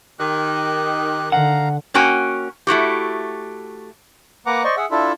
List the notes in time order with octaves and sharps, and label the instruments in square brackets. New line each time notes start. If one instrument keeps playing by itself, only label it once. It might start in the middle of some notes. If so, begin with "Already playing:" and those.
[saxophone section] D#3 [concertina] G4 F#6
[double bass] D3 [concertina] F5 A#5 [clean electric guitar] F#5
[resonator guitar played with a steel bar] A#3 C#4 F#4 G5 G#5
A3 E4 F#4 G4
[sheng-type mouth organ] A#3 B4 F#5 A#5 D6
C5 D5 D#5 C#6
G#4 E5 F#5
D4 E4 F4 A4 E5